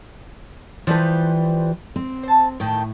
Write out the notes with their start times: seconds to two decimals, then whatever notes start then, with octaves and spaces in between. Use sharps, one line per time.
0.87 E3 F3 G3 B4 C5
1.96 C4
2.23 C5 A5
2.60 A2 D#3 A3 G5